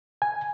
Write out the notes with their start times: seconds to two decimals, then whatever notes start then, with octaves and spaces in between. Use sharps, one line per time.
0.22 G#5